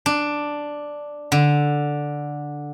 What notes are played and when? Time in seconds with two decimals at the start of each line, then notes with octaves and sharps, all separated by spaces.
0.06 D4
1.32 D3